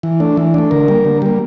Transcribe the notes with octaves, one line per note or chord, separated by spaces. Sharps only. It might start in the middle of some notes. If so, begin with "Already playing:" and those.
E3
A3 D4
E3
A3 D4
D3 A#4
G3 A#3
D3
G3 A#3